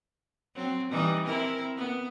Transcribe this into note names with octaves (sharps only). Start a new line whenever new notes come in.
F#3 C4
E3 G3 D#4
C4 E4 A#4
B3